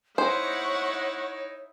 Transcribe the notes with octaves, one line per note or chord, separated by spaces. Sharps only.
D#4 E4 C5 C#5 F#5 C#6